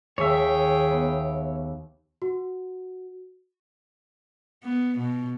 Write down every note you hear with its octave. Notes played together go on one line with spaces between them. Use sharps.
D#2 G#4 C#5 E5 G5
B3
F#4
B3
B2